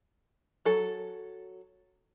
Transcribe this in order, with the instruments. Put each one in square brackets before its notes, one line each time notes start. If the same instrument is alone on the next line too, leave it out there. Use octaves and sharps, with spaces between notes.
[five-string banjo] F#3 A4